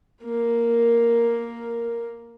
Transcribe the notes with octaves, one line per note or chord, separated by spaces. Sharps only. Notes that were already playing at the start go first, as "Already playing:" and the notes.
A#3 A#4